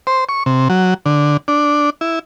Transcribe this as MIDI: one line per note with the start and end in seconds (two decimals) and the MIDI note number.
0.07 0.24 72
0.29 0.43 85
0.46 0.68 48
0.69 0.94 54
1.06 1.37 50
1.48 1.90 62
2.01 2.19 64